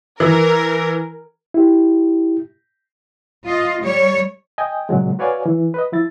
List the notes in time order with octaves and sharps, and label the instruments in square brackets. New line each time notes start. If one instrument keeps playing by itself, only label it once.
[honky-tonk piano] E3 [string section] A#4
[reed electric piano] E4 G4
[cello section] F4 D#5
G3 C#5
[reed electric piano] D#5 G5 G#5
A#2 C#3 F#3 G#3
F#4 B4 C#5 D5 F5 G#5
E3
B4 D#5
F3 E4 A6